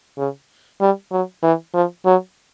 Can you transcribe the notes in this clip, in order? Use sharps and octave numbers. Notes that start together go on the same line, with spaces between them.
C#3
G3
F#3
E3
F3
F#3